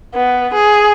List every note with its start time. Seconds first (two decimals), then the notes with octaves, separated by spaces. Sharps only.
0.14 B3
0.54 G#4